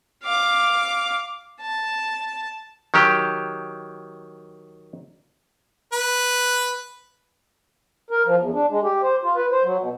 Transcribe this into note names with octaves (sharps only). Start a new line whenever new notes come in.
F5 D6
A5
D#3 F#3 G4
B4
A#4
F3
E2
D4
G#3
G4
C5
F4
B4
C5
F#3
B2